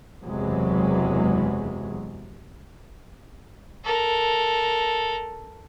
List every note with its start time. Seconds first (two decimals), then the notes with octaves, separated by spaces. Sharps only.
0.23 F#1 E2 C3 E3 F#3 G#3
3.84 A4 A#4